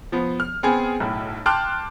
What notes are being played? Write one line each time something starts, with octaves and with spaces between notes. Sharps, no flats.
F3 B3
F6
B3 C4 G#4 G#5
B1 A2
G5 A5 C6 D6 F6 F#6